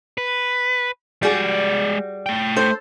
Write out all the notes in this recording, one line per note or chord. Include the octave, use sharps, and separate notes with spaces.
B4
G3 G#3 F#4 G#4 D5
A3 G5
A4 C5